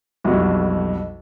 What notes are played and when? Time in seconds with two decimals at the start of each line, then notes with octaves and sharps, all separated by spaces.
0.24 B1 F2 G3 E4 F#4